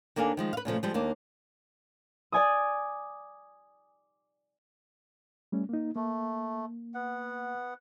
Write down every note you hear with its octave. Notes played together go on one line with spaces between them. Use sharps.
D#2 A#3 D4 A4 F5 G#5
D#3 F3 G#3
B4 F5
A#2 C#3 F3 A3
F3 G3 G#3
D#2 A#3 D4
D5 G#5 D#6
G3 A3 C#4
A#3 D#4
A3 A#3
B3 F#5